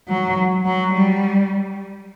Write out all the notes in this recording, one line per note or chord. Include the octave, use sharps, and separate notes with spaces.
F#3
F#3
G3